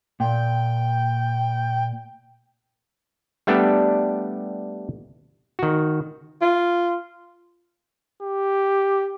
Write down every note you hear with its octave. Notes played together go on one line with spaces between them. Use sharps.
A#2 G5
G3 A3 B3 D4 G4 A4
D#3 F#4
F4
G4